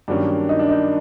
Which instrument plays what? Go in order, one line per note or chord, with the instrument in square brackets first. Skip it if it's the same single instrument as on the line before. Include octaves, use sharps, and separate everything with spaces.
[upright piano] G2 D#3 F#3 A#3 C#4 [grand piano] D4
[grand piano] D#4
D4
D#4